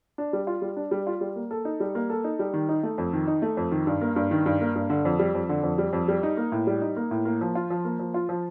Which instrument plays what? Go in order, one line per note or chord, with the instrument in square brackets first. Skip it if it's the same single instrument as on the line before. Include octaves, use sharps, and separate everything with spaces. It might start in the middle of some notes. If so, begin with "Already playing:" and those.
[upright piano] D4
G3
F4
G3
D4
G3
F4
G3
A#3
A4
D#4
G3
A#3
A4
D#4
G3
D#3
D#4
A3
F2
D#3
D#4
A3
F2
D#3
G2
A#3
G2
D#3
G2
A#3
G2
D3
F2
G3
F2
D3
F2
G3
F2
G3
D#4
A#3
A2
G3
D#4
A#3
A2
A#3
F3
F4
F3
A#3
F3
F4
F3